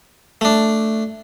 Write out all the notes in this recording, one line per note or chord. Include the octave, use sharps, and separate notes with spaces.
A3 D4